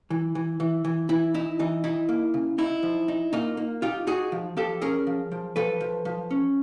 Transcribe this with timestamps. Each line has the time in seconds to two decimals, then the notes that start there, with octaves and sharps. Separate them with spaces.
0.10 E3
0.35 E3
0.60 E3
0.85 E3
1.09 E3 E4
1.34 D#4 E4
1.59 E3 D#4
1.84 D#4 E4
2.09 A#3
2.34 C#3
2.58 D#4 E4
2.83 F3
3.08 D#4
3.33 A#3 D#4 F4
3.57 A#3
3.82 D#4 F4 G4
4.07 D#4 F#4 G#4
4.32 F3
4.57 F3 G4 A4
4.82 C#4 G#4 A#4
5.07 F3
5.32 F3
5.56 F3 A4 B4
5.81 F3
6.05 F3
6.31 C#4